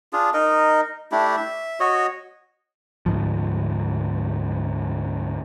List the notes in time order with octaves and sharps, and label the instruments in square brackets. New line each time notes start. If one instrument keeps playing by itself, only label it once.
[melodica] D4 F4 G#4
D#4 A#4 D#5
A3 D4 E4 G4
E5
F#4 C#5 D#5
[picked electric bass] D2 G#2 F3